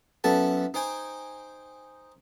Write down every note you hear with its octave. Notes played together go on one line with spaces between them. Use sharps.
F#2 B3 E4 A4 A5
D#4 C5 G5 G#5